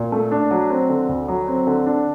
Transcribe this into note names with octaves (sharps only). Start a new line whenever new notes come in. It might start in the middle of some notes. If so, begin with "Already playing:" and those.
Already playing: A#2
A3
D4
F#3
C4
D3
D2
F#3
C4
D3
D4